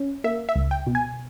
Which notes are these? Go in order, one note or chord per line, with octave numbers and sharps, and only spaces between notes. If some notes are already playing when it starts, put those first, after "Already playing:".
Already playing: C#4
A#3 E5
E5
C#2
G5
B2
G#5